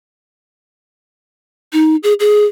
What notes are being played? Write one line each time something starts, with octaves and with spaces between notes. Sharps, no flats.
D#4
G#4
G#4